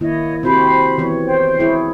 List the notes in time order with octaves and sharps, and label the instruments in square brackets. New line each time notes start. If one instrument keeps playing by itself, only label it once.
[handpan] D#3 A#3 E4 [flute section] C#5 D#5
[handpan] C4 F#4 G4 [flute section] C5 B5
[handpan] E3 B3 C#5
[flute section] C5 G5
[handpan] E4 G#4 C#5